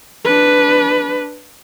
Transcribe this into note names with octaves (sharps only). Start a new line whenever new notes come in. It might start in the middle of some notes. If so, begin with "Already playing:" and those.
D4 B4